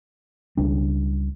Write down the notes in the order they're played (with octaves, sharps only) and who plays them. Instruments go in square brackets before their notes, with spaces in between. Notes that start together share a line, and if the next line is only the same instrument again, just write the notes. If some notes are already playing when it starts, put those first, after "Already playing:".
[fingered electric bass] C#2 C#3 G3 D4